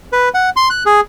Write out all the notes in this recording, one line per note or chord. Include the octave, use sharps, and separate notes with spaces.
B4
F#5
C6
F#6
G#4